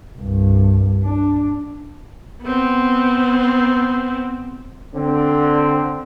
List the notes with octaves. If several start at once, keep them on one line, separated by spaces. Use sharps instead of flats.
C2 G2
D4
B3 C4
D3 C4